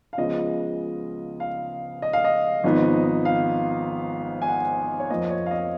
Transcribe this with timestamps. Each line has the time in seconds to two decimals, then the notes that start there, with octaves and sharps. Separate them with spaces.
0.13 F5
0.18 C#2 C#3 F3 B3 F4 D#5
1.40 F5
2.02 D#5
2.13 F5
2.24 D#5
2.64 G#1 G#2 F3 B3 D#4
3.25 F5
4.42 G#5
4.48 F#5
5.00 C#5
5.10 F2 F3 A#3 D#5
5.30 C#5
5.46 F5
5.51 D#5